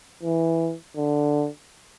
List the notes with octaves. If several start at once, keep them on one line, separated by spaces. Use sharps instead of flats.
E3
D3